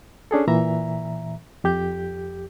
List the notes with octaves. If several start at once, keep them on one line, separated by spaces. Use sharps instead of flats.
C#4 D4 G#4 A4
A#2 E3 E5 A#5
F2 G4 G6